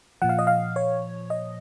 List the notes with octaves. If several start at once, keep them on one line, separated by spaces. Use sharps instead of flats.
A#2 F3 F#5
F5
D#5
F5
C#5
D#5